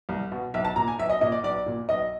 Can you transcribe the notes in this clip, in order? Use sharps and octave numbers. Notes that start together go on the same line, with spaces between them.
C2
B2
B1 E5
A5
A#2 A#5
G#5
B1 E5
D#5
A#2 D#5
D5
B1 D5
A#2
B1 D#5